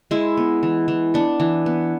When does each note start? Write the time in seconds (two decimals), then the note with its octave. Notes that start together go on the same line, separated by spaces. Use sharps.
0.11 G#3 E4
0.37 B3
0.63 E3
0.88 E3
1.14 B3 D4
1.40 E3
1.66 B3